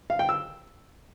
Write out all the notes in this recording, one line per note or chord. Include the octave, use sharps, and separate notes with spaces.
F5
G5
E6